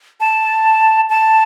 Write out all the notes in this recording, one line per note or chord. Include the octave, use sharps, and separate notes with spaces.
A5
A5